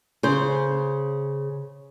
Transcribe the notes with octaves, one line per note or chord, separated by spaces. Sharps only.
C#3 C5